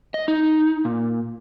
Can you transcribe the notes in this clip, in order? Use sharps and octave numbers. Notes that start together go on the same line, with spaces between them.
D#5
D#4
A#2